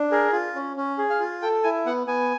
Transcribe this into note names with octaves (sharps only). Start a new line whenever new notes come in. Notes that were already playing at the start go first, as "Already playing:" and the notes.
Already playing: D4
G#4 A#4
F4
C#4
C#4
G#4
F5
F4
A4 G5
E4 G#5
B3 F#5
B3 G#5